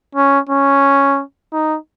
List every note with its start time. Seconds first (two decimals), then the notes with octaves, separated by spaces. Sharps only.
0.15 C#4
0.49 C#4
1.53 D#4